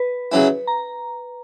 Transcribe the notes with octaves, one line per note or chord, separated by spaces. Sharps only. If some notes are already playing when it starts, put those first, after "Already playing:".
Already playing: B4
C#3 F#3 C#4 E4
A#5